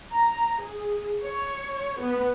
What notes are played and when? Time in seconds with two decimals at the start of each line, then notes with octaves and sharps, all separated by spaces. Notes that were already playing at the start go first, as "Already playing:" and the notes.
0.12 A#5
0.60 G#4
1.24 C#5
2.00 B3